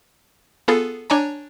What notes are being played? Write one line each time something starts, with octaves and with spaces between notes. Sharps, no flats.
B3 F4 G#4 A4
D4 C#5 G#5 A#5